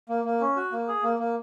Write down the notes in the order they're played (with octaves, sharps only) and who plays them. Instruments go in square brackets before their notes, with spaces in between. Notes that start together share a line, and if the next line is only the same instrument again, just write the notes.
[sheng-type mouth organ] A#3
A#3
C#4
F#4
A#3
G#4
A#3
A#3